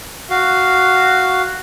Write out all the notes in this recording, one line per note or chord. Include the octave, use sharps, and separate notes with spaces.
F#4 F5